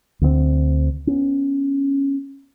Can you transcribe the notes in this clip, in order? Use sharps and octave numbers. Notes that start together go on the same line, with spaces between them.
D2 D3 A#3 C4
B3 C#4